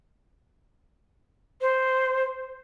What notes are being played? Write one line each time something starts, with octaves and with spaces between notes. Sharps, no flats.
C5